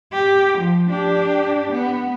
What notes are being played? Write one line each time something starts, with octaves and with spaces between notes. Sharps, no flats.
G4
F3
D4 G4
B3